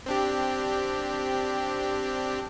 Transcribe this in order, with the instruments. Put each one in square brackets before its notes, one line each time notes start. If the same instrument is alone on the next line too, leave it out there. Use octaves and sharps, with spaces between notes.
[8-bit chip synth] C4 D4 G4